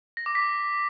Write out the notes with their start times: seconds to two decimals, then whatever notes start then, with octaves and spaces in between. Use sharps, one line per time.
0.17 A#6
0.26 D6
0.35 B6